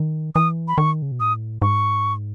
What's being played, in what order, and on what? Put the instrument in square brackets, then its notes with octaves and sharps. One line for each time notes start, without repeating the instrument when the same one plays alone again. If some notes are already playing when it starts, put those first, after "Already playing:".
Already playing: [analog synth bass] D#3
[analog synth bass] E3 [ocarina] D#6
[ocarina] B5
[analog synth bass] D#3 [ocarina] C#6
[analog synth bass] C#3
B2
[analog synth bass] A2 [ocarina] D#6
[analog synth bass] G#2 [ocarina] C#6